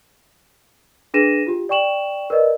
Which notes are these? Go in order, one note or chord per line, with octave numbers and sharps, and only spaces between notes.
D4 G#4 B4 A#6 D#7 E7
F4 G4
D5 G5 C#6 E7 F#7
A#4 B4 D5 D#5